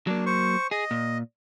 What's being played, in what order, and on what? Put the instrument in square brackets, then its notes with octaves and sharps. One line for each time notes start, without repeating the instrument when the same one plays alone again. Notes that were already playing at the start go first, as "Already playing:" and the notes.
[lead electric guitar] F#3 A#3 [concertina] D4
[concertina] C5 C#6
[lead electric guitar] G#4 [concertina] D#5
[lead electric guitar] A#2